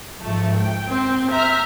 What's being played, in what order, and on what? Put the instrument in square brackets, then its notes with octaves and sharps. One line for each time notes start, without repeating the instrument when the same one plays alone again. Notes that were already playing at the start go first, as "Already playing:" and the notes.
[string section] G#2 F3 A3
G5
[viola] C4
[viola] E5 [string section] A#5 F6